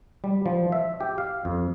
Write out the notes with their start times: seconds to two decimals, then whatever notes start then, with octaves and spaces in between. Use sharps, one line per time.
0.24 G3
0.46 F3
0.72 E5
1.01 G4
1.18 F5
1.45 F2